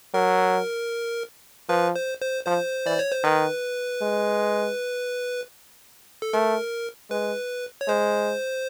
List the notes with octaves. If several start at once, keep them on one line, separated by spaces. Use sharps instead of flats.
F#3 A#4
F3 B4
C5
C5
F3 C5
E3 D5
C#5
C5
D#3 B4
G#3
A4
A3 A#4
G#3 B4
C#5
G#3 C5